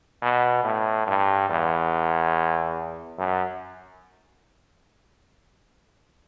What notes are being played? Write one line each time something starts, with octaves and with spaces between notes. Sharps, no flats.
B2
A2
G2
E2
F#2